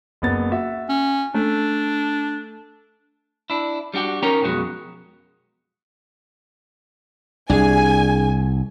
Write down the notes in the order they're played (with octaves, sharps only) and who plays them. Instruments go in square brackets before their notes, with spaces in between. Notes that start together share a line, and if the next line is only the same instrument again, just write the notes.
[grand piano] F#1 B3 A6
F#4 E5
[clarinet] C#4
[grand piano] A3 [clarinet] D4
[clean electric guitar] D4 E4
G3 D4 F#4 G4
C#4 D#4 A#4 C#5 G5 A#5
B1 F2 B2 G#3 F#4
[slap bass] C2 [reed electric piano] D4 G#4 [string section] G#5